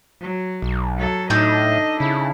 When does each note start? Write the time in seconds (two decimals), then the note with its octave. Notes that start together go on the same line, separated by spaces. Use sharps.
0.21 F#3
0.62 B1
0.97 F#3 A4
1.30 A2 D4 D#4 A4 D#5
2.00 C#3 E4